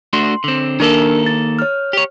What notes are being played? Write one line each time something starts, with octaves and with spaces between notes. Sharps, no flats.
A3 D4 F#4 C6
D3 C4
D#3 A#3 D4 A4 A#4
A6
C#5 F6
G4 C#5